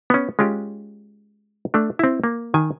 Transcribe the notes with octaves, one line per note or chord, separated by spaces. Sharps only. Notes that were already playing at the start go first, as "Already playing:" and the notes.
B3 C#4
G#3 C#4 F4 G4
A3 D4
C4 E4
A#3
D#3 G#5